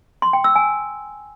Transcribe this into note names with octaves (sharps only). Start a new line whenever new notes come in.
C6
G5
E6
G#5